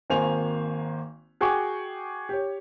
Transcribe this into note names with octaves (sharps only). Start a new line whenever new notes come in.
G#1 D#3 A#3 C5 G#5 F7
F#4 G#4 F#5 G5 C#6 D6
G4 C#5